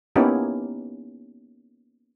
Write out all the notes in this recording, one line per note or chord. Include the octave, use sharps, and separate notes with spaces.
A#3 B3 C#4 D#4 E4 G4